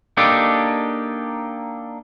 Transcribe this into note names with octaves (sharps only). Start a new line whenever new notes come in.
A#3 D4 D#4 G4 A4